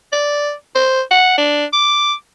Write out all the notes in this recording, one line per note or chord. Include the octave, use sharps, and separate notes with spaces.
D5
C5
F#5
D4
D6